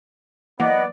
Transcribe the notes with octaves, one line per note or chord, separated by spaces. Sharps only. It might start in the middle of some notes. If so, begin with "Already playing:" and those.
E3 F#3 A#3 B3 D5 D#5 F#5